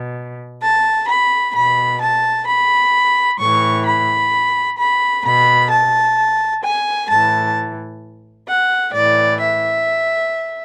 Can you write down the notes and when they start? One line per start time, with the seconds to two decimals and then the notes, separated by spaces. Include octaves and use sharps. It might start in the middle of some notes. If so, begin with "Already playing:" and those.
Already playing: B2
0.62 A5
1.09 B5
1.55 B2 B5
2.01 A5
2.47 B5
3.39 A2 E3 C#6
3.86 B5
4.78 B5
5.25 B2 B5
5.71 A5
6.63 G#5
7.09 A2 E3 A5
8.48 F#5
8.94 A2 E3 D5
9.40 E5